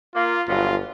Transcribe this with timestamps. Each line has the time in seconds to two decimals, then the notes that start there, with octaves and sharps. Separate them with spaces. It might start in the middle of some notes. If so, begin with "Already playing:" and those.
0.15 A#3 F4
0.48 G1 B2 F#3 F4